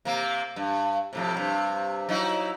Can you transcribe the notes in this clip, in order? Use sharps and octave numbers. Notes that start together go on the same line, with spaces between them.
C3 A#3
G2
F2 A2 C3
G2 C3
F#3 D#4 E4